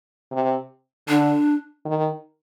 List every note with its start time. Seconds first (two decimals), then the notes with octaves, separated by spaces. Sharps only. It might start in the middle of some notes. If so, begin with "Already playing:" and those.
0.32 C3
1.09 D3 D4
1.85 D#3